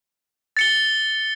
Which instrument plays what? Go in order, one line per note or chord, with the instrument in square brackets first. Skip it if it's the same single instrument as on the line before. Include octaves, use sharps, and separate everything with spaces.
[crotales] A6 C#7 G7